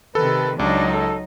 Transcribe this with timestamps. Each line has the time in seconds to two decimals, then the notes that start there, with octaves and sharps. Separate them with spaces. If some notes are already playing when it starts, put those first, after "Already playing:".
0.15 C3 D#3 A4 B4
0.59 C#2 F#3 D4 D#4
0.93 A4